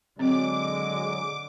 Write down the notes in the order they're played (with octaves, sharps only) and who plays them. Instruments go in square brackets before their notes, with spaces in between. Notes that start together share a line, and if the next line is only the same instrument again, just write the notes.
[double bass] D3 [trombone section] F#3 G#3 [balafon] C4 [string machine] D6